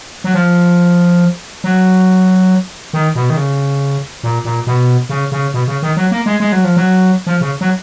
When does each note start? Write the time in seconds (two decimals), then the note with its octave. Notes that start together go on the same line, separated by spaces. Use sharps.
0.24 F#3
0.34 F3
1.64 F#3
2.93 D#3
3.16 B2
3.30 D#3
3.37 C#3
4.24 A#2
4.45 A#2
4.67 B2
5.09 C#3
5.32 C#3
5.54 B2
5.68 C#3
5.83 D#3
5.97 F#3
6.11 A#3
6.26 G#3
6.40 G#3
6.52 F#3
6.64 F3
6.77 F#3
7.27 F3
7.41 C#3
7.61 F#3